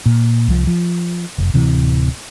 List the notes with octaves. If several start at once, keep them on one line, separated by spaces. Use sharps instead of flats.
A#2
C2 F3
F3
F1
D1 C3 E3